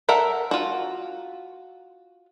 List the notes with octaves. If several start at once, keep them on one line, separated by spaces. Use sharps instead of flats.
A4 A#4 E5 F#5
F4 F#4